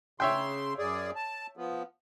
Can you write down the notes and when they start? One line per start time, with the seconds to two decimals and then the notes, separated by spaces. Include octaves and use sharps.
0.20 C#3 C#5 E5 G5 C6
0.78 F#2 G#4 D5
1.16 A5
1.57 F3 B3